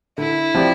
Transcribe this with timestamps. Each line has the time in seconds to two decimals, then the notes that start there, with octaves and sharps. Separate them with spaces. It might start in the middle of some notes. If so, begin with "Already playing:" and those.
0.18 D3 E4
0.54 F3 C4 G4 D5